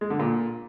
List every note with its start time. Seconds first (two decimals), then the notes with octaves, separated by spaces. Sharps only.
0.01 G#3
0.10 D3
0.20 A#2